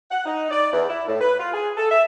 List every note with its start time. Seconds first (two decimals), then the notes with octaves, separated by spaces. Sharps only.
0.11 F#5
0.26 D#4
0.51 D5
0.72 E2
0.89 E4
1.08 A2
1.20 B4
1.39 F4
1.54 G#4
1.77 A4
1.91 E5